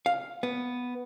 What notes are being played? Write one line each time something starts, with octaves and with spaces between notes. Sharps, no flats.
F5
B3